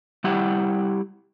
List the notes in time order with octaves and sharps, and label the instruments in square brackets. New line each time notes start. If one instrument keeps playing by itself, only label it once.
[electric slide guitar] G3 E4 G4 F#5